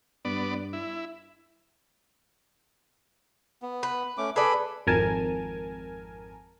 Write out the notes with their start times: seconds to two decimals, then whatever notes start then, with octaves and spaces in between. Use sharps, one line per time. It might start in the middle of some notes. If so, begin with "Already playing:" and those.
0.25 G2 B3 D5
0.73 E4
3.62 B3
3.83 B4
4.18 A3 C#4 D6
4.36 G#4 A4 B4 D5 B5
4.87 G#1 F2 A#4 G#5 A5 G#6